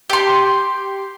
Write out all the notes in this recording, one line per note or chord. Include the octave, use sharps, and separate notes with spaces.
G4 C6